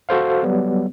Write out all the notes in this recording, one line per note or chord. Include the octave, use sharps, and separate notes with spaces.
F#4 A4 C5 F5
F#3 G3 B3